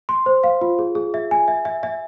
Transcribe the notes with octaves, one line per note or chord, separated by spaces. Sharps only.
C6
C5
F5
F4
G#4
G#4
E5
G#5
E5
E5
E5